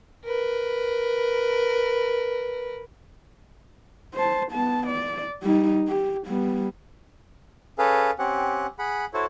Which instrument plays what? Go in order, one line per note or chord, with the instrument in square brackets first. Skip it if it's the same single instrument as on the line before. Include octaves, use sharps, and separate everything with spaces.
[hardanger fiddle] A#4 B4
[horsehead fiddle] C5 A5
B3 A5
D5
G3 D#4
G4
G3 B3
[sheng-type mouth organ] C#4 G#4 A4 B4 F5
C4 C#4 G4 F#5
G#4 F#5 B5
E4 F#4 A4 C5 C#5